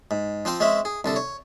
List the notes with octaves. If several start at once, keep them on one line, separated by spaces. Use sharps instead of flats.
G#2
F3 C4 G5 C6
G#3 C4 C#4 E5
G#4
C2 D3 A4
C#5